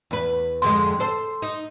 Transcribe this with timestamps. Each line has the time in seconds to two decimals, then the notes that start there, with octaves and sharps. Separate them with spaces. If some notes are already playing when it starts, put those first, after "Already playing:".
0.11 E2 B4
0.62 F2 D3 G#3 C6
1.00 A4 C5
1.42 D#4